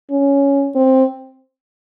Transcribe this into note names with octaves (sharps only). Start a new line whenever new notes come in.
C#4
C4